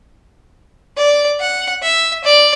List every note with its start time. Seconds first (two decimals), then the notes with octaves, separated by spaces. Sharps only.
0.97 D5
1.39 F#5
1.82 E5
2.24 D5